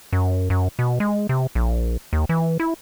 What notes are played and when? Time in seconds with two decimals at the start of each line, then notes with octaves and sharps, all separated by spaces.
0.13 F#2
0.50 F#2
0.79 B2
1.00 G#3
1.29 C3
1.55 A#1
2.13 D#2
2.29 E3
2.60 E4